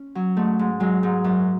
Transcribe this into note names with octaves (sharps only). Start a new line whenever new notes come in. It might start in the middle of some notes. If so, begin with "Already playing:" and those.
Already playing: C#4
F#3
G#2 A3
G#2
F#3 G#3
G#2
F#2